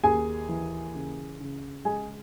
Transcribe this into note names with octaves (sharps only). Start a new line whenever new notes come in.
D#2 G#4 G#5
E3
C#3
C#3
G#3 G#4 G#5